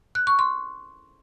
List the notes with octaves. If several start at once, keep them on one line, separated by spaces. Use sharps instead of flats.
F#6
C#6
C6